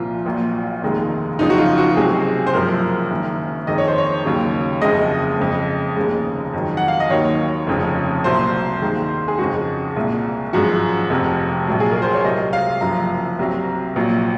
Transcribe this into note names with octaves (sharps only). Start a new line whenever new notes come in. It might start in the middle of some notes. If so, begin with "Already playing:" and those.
Already playing: C2 A#2 F3 F4
A#1 A#2 F#3
F1 D#2 D#3 G#3
F#1 F2 C#3 F3 D#4
F#4
F4
F#4
C#2 C3 F#3 G#4
C5
F#1 F#2 F3 G#3 A#4
F#1 F#2 D#3
F2 D#3 G#3 D#5
C#5
C5
C#5
D#2 C#3 F#3
F#1 F2 C#3 G#3 D#5
F2 C#3 G#3
F1 D#2 C#3 G#3
F2 D#3 F#3
F#5
F5
D#5
D#2 D#3 F#3 C#5
F1 F2 C#3
C2 A#2 F#3 C5
D#2 D#3 G#3
G#4
F2 C#3 G#3 F#4
C2 A#2 G#3
G#1 F#2 F3 G#3 F#4
F1 F2 C3
A#1 G#2 F#3
G#4
A#4
C5
C#5
C2 C3 F#3 D#5
F5
F#1 F#2 F3 A#5
C2 C3 F#3
A#1 A#2 F#3